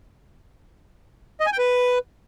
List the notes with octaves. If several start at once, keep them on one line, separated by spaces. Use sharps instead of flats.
D#5
G#5
G5
B4